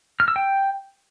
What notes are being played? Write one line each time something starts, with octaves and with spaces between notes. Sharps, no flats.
F6
E6
G5